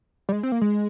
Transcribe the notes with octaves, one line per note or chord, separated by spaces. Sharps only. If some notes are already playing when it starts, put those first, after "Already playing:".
G3
G#3
C4
A#3
G#3